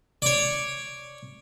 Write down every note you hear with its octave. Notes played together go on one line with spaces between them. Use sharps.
C#5 D5